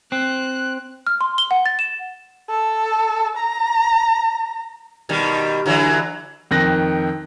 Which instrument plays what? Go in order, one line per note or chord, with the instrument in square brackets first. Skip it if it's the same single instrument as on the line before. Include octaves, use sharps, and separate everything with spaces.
[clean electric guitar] C4 [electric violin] F#6
[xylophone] F6
C6
G7
F#5
A6
E7
[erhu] A4
A#5
[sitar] B2 D#3 G3
D3 E3 F#3
[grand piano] F2 D#3 F#6 A#6